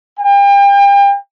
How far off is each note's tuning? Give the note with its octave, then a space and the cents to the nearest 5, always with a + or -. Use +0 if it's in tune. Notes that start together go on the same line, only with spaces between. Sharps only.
G5 +35